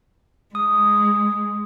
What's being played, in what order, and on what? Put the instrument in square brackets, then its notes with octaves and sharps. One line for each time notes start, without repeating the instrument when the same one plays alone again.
[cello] G#3 [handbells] D#6